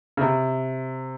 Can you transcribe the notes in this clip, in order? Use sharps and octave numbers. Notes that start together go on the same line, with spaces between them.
C#3
C3